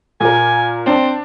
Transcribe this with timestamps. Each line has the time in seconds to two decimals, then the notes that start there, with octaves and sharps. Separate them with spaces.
0.21 A#2 A#4 G#5
0.86 C4 D4 A5